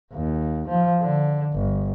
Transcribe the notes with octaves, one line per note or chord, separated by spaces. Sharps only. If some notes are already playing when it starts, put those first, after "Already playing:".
D#2
F3
D3
G1